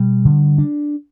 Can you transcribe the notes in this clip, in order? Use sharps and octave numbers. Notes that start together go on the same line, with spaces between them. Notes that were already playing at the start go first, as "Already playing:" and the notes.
Already playing: B2 G3
D3
D4